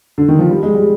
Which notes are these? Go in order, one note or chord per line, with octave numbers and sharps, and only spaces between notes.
D3
D#3
F3
G3
G#3
G3